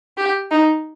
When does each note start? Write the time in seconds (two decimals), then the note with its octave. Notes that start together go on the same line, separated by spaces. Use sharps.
0.17 G4
0.51 D#4